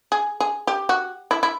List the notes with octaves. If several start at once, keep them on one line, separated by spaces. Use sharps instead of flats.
G#4
G#4
G4
F#4
E4
E4